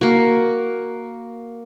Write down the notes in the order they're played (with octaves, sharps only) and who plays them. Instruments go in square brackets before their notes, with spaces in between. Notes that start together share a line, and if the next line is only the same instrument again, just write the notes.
[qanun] A#3 F#4